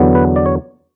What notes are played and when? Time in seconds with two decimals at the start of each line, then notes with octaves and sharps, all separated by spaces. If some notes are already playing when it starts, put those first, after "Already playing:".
Already playing: E2 D3 F#3 B3
0.15 B4
0.36 D5
0.46 C#5